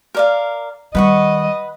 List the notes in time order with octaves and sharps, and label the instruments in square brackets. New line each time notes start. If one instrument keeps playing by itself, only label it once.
[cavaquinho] A#4 D5 F5
[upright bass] D#3 G3 [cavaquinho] B4 F#5 C#6 [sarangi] D#5